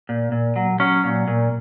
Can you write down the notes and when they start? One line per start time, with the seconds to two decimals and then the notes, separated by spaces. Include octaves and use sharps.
0.09 A#2
0.32 A#2
0.56 F#3
0.80 F#3 C#4
1.04 A#2
1.28 A#2